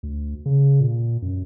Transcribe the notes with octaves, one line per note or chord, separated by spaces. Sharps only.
D2
C#3
A#2
F#2